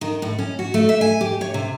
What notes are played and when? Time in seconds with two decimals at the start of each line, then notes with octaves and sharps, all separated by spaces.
0.01 D#3
0.22 A2
0.39 C#4
0.59 F#4
0.74 A3
0.89 E5
1.01 G#5
1.21 G4
1.41 C#5
1.54 C3